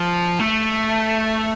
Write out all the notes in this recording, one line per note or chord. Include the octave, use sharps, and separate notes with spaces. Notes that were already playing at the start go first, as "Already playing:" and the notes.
Already playing: F3
A3